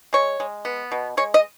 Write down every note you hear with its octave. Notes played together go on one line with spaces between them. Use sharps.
G#3 C#5
G#3
B3
B2
G#3 C#5
D#5